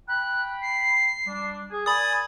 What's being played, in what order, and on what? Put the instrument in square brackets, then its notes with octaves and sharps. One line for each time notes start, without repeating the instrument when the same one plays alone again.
[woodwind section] G5 B5 [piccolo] F#6
[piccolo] C7
[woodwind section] G3 D4
G#4
[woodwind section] A#4 D5 G#5 [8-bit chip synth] B5 D#6 [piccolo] A6